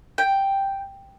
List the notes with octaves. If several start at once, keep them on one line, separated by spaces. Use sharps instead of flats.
G5